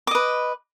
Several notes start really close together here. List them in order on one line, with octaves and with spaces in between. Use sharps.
D6 D#5 B4